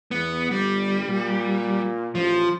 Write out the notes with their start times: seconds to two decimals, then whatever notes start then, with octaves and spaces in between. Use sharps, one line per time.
0.11 E2 B3
0.51 G1 G3
1.08 A#2
2.15 A1 F3